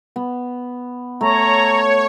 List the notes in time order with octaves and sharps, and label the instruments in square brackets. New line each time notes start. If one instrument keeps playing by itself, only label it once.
[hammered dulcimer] B3
[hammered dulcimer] A3 [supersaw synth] C#5 [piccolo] A#5